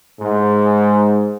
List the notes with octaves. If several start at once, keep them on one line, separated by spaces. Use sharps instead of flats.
G#2